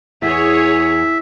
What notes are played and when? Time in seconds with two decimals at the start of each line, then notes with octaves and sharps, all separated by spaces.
0.22 E2 G#4 C#5 E5